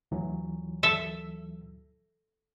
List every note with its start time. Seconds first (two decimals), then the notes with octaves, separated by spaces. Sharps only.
0.11 D2 E3 F#3
0.83 A4 E5